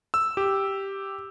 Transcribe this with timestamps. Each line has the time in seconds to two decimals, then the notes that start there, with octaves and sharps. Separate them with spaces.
0.14 E6
0.37 G4